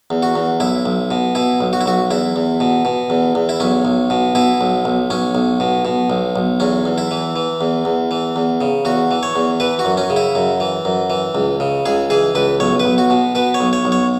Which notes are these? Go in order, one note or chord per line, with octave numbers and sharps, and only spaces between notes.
E2
F#4
E2
B1 E4
B1
B2
B2 E4
B1
F#4
E4
B1 F#4
E2 E4
E2
B2
B2
E2
E2
E4
B1 C#4
B1
B2
B2 E4
B1
B1
B1 C#4
B1
B2
B2
B1
B1
E2 C#4
E2
E4
E3
E3
E2
E2
E3
E2
C#3
E2 F#4
E3
C#5
E2
E3 B4
F#4
F#2
C#4
C#3
E4
F#2
E3
F#2
E3
C#2
C#3
C#2 G#4
E3 G#4
C#2 B4
B1 C#5
B4
B1
F#4
B2
B2 B4
C#5
B1
C#5
B1
C#5